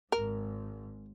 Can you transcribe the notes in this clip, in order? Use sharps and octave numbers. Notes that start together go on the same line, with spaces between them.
G#1 G#2 A#4